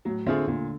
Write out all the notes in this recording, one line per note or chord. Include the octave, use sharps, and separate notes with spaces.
A2 F#3
D3 A3 C4 F4 G#4
A#2 D3